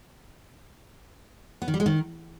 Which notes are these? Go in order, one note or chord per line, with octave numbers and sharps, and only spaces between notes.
B3
D#3
G3
G#3
D#3